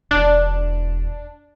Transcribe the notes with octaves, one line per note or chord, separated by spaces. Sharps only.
E1 D4